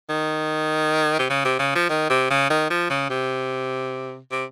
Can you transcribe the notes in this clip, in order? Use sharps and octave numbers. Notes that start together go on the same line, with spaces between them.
D#3
C3
C#3
C3
C#3
F3
D#3
C3
C#3
D#3
F3
C#3
C3
C3